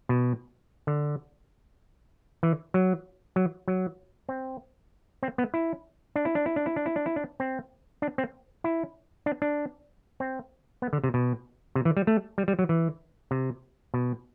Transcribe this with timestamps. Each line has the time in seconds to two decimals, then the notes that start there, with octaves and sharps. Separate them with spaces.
0.09 B2
0.87 D3
2.43 E3
2.74 F#3
3.36 F#3
3.68 F#3
4.29 C4
5.23 C4
5.38 B3
5.54 E4
6.16 D4
6.25 E4
6.35 D4
6.46 E4
6.56 D4
6.66 E4
6.76 D4
6.86 E4
6.96 D4
7.06 E4
7.16 D4
7.40 C4
8.02 D4
8.18 C4
8.64 E4
9.26 D4
9.42 D4
10.20 C4
10.82 B3
10.93 D3
11.04 C3
11.14 B2
11.75 C3
11.85 E3
11.97 G3
12.07 A3
12.38 G3
12.48 G3
12.59 F#3
12.69 E3
13.31 C3
13.94 B2